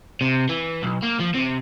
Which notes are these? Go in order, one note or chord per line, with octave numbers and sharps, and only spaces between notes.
C3
E3
B1
A#3
F3
C3